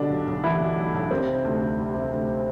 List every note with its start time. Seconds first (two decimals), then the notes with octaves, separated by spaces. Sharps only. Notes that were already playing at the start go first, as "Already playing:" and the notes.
Already playing: B2 D3 G3 D4
0.10 B1
0.27 B1
0.44 E3 G3 E4
0.60 B2
0.77 B1
0.94 B1
1.11 G3 C4
1.27 C3
1.45 D2
1.61 D2
1.78 G3
1.95 C3
2.12 D2